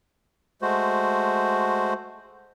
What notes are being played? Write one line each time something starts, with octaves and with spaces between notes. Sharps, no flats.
G#3 A3 F#4 C5